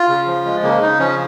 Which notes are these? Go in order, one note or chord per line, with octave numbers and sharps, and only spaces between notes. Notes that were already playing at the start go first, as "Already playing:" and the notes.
Already playing: F4
C#3
F3
G#3
C#3 A#3
C#3 D#4
F3 C#4